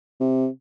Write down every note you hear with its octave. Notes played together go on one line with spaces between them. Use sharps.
C3